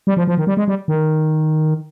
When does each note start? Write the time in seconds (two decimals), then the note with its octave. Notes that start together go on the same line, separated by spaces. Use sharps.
0.07 G3
0.17 F3
0.27 F3
0.38 D#3
0.47 G3
0.57 G#3
0.68 G3
0.88 D#3